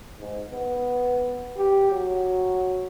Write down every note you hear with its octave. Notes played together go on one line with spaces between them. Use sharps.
G#2
B3
G4
F#3